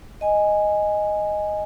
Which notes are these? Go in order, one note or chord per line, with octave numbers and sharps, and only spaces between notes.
D#5 G#5